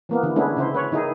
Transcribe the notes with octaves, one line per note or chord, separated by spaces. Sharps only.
E3 A#3 B3
D3 E3
G#3 A3 B3 C#4 D4 E4
C#3 E4 C5
B4 C#5
D#3 D#4 E4 G#4